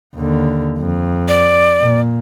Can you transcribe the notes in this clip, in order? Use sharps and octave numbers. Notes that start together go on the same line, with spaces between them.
D#2 D3
F2
D5
A#2